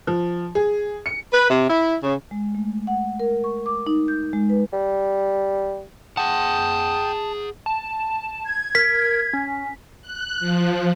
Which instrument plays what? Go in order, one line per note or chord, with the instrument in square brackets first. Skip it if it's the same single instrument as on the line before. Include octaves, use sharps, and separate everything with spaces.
[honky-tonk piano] F3
G#4
C#7
[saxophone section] B4
C3
E4
C#3
[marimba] G#3
A3
F#5
A#4
C#6
D6
D#4
G6
G#3
B4
[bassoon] G3
[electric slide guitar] G#4 F#5 [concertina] G5 D#6 [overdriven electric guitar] A5
[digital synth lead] A5
[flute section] G#6
[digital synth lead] A#4 [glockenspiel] B6
[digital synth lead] C#4
[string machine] F#6
F3